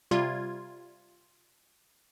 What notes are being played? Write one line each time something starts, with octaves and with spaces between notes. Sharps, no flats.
C3 G3 F4 G#6